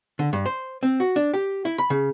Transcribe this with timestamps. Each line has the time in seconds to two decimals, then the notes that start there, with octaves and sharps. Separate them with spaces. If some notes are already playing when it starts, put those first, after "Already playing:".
0.19 D3
0.33 G2
0.46 C5
0.83 C4
1.00 F#4
1.16 D4
1.34 G4
1.65 E4
1.78 B5
1.90 C#3